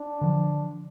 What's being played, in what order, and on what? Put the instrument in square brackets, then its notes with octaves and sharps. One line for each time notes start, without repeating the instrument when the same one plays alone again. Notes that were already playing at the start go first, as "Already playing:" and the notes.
Already playing: [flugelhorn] D4
[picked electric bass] D3 F3